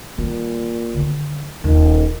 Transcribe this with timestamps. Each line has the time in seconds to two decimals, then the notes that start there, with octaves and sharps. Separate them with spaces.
0.18 A#2 D#3 G3
0.94 D3 D#3
1.64 D#1 D#3